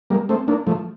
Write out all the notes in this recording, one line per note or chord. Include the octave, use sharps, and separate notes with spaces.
G3 A#3
A3 C4
A#3 D4
F3 A3